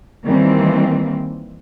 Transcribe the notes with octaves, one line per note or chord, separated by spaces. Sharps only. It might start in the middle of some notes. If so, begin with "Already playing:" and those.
D#3 E3 G3 A#3 C4